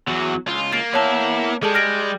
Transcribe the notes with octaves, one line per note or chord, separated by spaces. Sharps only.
E2 F#3
C#2 F4
A#3 A6 C7 D7
B3 E4 C#5 A5
G3 G#3 G#4 A4 A5
F6 A#6 D7